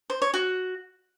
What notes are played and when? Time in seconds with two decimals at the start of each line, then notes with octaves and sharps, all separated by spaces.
0.10 C5
0.22 C#5
0.34 F#4